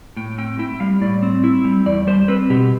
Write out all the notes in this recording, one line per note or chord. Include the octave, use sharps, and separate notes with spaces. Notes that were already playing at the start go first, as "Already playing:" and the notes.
A2 G5
C4 G5
E4 G5
G3 F5
A2 D5
C4
E4
G3
E2 D5
G3 C5
C4 B4
B2 G4